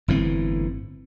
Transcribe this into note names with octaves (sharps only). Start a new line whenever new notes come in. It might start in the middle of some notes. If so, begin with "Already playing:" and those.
G1 A2 E3 C4